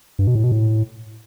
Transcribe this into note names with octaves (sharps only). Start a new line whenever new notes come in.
G2
B2
A2
B2
A2